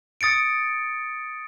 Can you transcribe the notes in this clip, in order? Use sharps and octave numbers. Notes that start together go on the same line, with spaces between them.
D#6 A6 C#7 D7